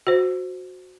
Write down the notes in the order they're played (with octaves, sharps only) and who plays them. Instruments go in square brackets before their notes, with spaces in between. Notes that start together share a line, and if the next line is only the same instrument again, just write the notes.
[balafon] F#4 C5